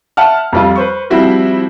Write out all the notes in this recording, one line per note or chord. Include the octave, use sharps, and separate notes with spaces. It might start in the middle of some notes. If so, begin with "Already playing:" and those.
E5 F#5 A5 F6
F2 G3 F4
B4 C5 C#6
F3 G3 C4 E4 F#4